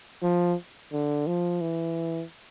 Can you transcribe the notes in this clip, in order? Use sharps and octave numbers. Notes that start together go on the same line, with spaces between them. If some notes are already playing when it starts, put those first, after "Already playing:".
F3
D3
F3
E3